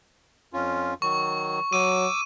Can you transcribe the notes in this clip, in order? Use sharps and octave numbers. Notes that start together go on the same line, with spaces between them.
F2 C#4 F4
D#3 F#3 C#6
F#3 D6 E6 D#7